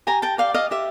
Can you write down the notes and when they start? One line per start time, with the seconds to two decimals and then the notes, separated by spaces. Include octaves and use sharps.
0.07 G4 G#5 A#5
0.22 G5 A5
0.38 D5 F5 G5
0.54 D#5 F5
0.71 G4 E5